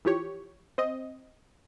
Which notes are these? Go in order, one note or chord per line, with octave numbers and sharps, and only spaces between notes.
E3 F3 G4 C#5
C4 D#5